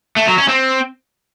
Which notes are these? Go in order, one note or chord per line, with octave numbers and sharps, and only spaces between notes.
A3
F#3
C#4
C4